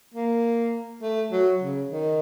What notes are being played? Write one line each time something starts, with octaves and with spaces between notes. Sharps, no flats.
A#3
A3
F#3
C#3
D#3